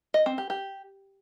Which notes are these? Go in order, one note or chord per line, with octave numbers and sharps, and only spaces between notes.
D#5
C4
G4
G4